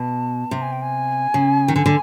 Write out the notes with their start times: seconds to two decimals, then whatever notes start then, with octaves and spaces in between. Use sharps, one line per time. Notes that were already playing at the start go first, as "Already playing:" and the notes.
Already playing: B2 A5
0.51 C3 A#5
0.62 G#5
0.72 G5
0.82 G#5
1.34 C#3
1.68 D#3
1.76 D3 G#5
1.86 D3